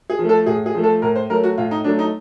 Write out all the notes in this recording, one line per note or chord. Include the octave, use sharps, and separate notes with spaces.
G#4
F3 A3
A4
A2 G#4
G#4
F3 A3
A4
A2 A#4
C5
F#3 A3 A#4
F#4
A2 F4
D#4
F#3 A3 D4
D#4